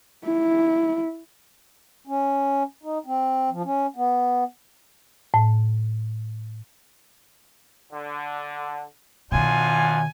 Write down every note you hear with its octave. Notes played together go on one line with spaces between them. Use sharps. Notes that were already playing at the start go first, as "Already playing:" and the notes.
E4
C#4
D#4
C4
F3
C#4
B3
A2
D3
F#2 B2 D#3 D4 F4 G#5